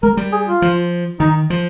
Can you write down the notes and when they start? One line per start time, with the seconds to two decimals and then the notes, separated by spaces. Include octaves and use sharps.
0.03 G#3 A#4
0.17 G3
0.32 G#4
0.47 F4
0.62 F3
1.20 D#3 D#4
1.50 F3